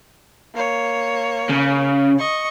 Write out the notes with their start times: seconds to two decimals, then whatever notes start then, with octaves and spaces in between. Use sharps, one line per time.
0.54 A#3 C#5
1.50 C#3
2.18 D#5 C#6